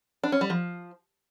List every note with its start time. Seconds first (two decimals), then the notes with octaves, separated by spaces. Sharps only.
0.23 D4
0.32 C#4
0.41 G3
0.50 F3